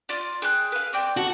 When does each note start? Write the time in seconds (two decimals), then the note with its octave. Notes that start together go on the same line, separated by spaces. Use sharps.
0.09 F4 D5
0.42 G#4 G5 F#6
0.72 B4 F5
0.93 C4 D5 G5
1.17 F#4 A4